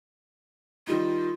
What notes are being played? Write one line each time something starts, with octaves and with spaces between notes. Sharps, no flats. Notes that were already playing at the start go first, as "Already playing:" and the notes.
D#3 G3 D#4 F4